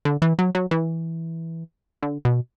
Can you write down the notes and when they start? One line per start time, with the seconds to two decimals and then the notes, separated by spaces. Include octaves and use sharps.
0.05 D3
0.22 E3
0.39 F#3
0.55 F#3
0.71 E3
2.03 D3
2.25 B2